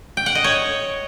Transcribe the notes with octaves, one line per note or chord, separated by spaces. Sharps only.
G5
F#5
D#5
C#5